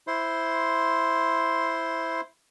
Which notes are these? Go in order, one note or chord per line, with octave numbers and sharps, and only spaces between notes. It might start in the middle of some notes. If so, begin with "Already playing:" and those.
E4 C5 C6